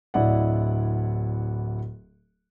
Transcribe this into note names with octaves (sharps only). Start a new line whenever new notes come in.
D1 E4 D5 D#5 F#5